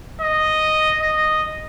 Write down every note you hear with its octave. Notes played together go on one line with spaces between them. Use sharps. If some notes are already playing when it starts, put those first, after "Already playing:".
D#5
D#5